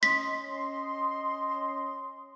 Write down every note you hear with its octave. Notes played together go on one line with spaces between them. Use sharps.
C#4 D#5 C6 B6